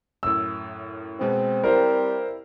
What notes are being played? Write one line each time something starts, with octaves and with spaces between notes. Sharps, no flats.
F#2 A2 E6
B2 G#3 B3 C4
G3 E4 A#4 C5 F5